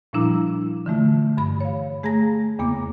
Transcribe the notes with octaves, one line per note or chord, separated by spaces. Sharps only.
A#2 F3 G3 D4 E4 A#5
D3 E3 A3 F4
G2 B5
C#5 F5
A3 G#4 G#5 A#5 A#6
E2 C#3 A#3 B3 D6